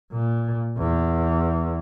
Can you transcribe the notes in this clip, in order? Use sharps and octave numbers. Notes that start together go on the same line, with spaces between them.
A#2
E2